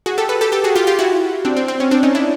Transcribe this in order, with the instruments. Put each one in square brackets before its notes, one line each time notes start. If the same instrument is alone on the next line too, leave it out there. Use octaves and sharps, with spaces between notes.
[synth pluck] F#4 G#4
G4 A4
A4 B4
G4 A4
G4 A4
F#4 G#4
F4 G4
F4 G4
E4 F#4
C4 D4
C4
C4
C#4
C4 D4
C#4 D#4
D4 E4